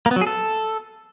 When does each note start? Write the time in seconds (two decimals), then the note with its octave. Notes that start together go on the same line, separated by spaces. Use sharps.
0.06 A#3
0.11 B3
0.16 F#3
0.21 G#4
0.27 A4